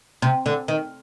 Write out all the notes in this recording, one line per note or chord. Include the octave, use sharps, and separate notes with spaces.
C3
D3
D#3